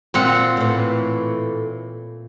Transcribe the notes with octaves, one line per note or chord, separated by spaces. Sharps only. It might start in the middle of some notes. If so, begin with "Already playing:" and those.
A#2 C4 F#5
A2 E3